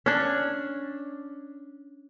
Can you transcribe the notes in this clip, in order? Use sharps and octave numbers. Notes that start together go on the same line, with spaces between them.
C#4 D4